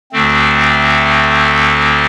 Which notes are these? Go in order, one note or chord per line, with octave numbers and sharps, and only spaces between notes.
D2 D3 A3 C4